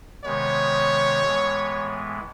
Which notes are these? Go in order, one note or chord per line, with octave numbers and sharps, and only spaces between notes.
C3 D#3 G#3 B3 C#5
A2 E3 G#3 B3